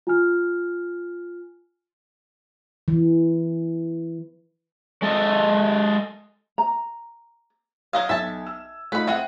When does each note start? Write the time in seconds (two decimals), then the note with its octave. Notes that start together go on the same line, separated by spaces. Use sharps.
0.07 F4 G#5 F6
2.88 E3
5.02 G#3 A4 D#5
6.58 A#5
7.93 F#3 D#5 F5 D#6 F6 G#6
8.09 B1 E5 A5
8.47 E6
8.92 A3 D#4 F4 B4 B5
9.07 C4 G#4 E5 F#5 G5